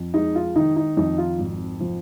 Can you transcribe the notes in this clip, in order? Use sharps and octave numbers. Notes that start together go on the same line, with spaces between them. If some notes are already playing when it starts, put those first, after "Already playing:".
Already playing: F2
G#3 D#4
F4
D#3 D#4
D#4
F2 D#4
F4
G#1
F3